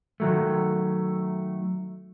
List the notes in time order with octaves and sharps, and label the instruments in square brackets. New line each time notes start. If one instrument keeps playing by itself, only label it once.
[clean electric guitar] D#3 F#3 A3